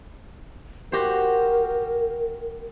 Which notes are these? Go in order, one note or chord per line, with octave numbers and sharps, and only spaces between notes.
F#4 G4 A#4 C5